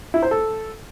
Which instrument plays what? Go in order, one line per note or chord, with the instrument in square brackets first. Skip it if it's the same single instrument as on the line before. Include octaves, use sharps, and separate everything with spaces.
[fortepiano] E4
C5
A4